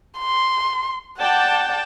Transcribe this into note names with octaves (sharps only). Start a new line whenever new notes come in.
C6
D5 F#5 G5 A5